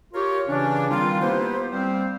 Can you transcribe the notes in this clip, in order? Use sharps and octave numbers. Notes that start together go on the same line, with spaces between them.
F4 G4 A#4 C#5
C#3 E3 C#4 D4
D#3 G3 C4 D#4 F4
A#3 B3 E4 G4 B4 C5
G3 C4 C5 F5